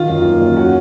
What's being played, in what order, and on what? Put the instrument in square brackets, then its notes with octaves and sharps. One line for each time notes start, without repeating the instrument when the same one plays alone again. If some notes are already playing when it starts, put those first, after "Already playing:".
Already playing: [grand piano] D#3 [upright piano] F4
[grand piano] F#2
A#3
F#2
[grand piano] C#4 [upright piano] F#4